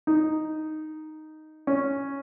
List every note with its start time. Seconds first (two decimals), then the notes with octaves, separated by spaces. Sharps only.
0.07 D#4
1.67 C#4